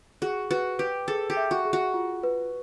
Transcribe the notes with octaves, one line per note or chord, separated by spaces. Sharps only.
F#4 G#4
F#4 B4
G4 B4
G#4 A4
G4
E5
F#4
G#4
F#4
F4
B4